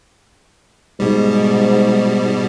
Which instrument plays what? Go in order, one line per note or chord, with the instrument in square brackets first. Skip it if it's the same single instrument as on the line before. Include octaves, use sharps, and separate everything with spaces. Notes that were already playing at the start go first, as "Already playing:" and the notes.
[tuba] G#2 [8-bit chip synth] B2 G3